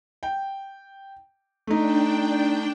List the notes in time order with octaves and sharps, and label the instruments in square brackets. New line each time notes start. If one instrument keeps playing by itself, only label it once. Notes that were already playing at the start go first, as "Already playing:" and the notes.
[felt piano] G5
[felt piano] A3 D#4 [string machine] D4 G5